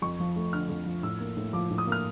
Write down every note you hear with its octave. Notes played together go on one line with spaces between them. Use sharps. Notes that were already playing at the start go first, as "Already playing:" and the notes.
F2 C#6
F3
A3
D3 F6
F2
F3
A2 E6
A#3
A2
F3 D6
A2
D#6
A#3 F6